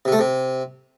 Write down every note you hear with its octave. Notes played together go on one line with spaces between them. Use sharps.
C3
A3
C3